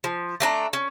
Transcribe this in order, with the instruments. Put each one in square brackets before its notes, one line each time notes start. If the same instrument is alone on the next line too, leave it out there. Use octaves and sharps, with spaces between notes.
[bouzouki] F3
A3 D4 G#5 A#5
C#4